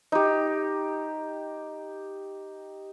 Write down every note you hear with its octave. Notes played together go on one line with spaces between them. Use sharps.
D#4 G4